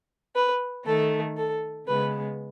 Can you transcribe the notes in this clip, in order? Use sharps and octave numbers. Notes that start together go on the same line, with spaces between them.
B4
D#3 A3 A4
A4
C#3 G#3 B3 B4